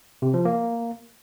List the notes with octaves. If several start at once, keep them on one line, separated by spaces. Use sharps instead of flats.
C3
F3
A#3